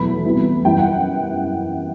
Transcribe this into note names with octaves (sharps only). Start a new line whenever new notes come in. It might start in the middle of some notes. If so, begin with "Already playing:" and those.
Already playing: E2 B2 F#3 A3 B5
C3 E3 G3 B3
F#2 E3 G3 G5
F#5